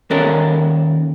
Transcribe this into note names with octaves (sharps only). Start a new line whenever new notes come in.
D#2 C#4 A4 A#4